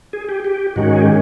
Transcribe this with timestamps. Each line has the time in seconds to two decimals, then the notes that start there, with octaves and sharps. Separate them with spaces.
0.13 G#4
0.29 G4
0.45 G4
0.76 G#2 D#3 G#3 C#4 F#4
0.93 G#4
1.01 G4